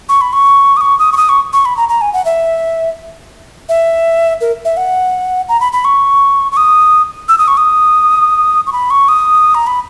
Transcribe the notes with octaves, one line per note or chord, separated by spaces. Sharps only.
C#6
B5
C#6
D#6
C#6
D#6
C#6
D#6
C#6
C#6
B5
A#5
A#5
G#5
F#5
E5
E5
A#4
E5
F#5
A#5
B5
B5
C#6
C#6
D#6
E6
D#6
C#6
D#6
C#6
B5
C#6
D#6
A#5
B5